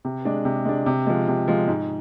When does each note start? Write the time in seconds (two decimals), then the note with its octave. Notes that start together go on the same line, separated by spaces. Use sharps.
0.05 C3
0.25 G#3 D4
0.45 C3
0.65 G#3 D4
0.86 C3
1.07 F3 G#3
1.28 C3
1.48 F3 G#3
1.68 G#2